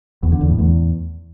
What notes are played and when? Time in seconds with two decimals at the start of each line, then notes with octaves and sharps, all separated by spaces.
0.23 E2
0.32 D3
0.41 E2
0.50 A2
0.59 E2